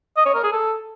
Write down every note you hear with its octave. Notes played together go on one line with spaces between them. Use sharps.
D#5
C#5
A#4
G#4
A4